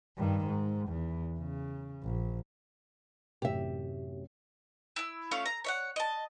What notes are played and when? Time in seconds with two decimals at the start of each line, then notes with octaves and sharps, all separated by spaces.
0.17 G2 D#3
0.46 G#2
0.89 E2
1.39 C#3
2.03 A#1
3.42 A1 F#2 C3 G4 E5
4.96 E4 E6
5.31 A3 C#4 F4 F5
5.46 A#5
5.64 C#5 E5 F#5
5.96 D#5 A5